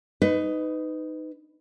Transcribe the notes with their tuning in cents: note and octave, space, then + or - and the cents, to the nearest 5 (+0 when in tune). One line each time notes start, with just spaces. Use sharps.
D#4 +0 B4 +25